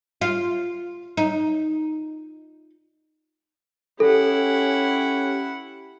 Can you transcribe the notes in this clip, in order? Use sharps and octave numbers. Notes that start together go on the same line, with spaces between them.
F4
D#4
C#4 E4 G4 A4 F#5